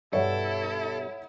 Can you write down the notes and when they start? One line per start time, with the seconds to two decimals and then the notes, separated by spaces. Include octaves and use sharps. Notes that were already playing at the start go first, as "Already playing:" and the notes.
0.13 G2 B2 G3 E4 A4 C#5 E5 F#5